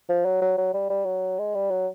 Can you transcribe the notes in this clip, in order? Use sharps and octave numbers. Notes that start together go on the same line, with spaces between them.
F3
F#3
F#3
F#3
G3
G3
F#3
G#3
G3
F#3